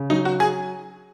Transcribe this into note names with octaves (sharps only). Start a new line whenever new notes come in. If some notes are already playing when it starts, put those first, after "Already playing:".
Already playing: C#3
F#3 D#4
F#4
G#4